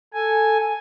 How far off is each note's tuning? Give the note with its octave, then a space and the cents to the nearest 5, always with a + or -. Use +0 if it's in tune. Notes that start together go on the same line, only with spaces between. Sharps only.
A4 +5 G#5 +0